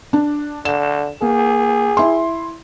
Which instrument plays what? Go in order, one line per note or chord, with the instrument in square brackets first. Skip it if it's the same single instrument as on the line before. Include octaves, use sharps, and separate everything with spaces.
[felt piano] D4
[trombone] D3 [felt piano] E7
[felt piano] A#3 [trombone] G#4
[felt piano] E4 C6